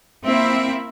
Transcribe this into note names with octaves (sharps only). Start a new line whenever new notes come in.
A#3 C4 E4 E5